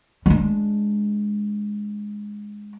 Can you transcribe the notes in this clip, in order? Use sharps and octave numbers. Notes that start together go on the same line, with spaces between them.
G#3 D4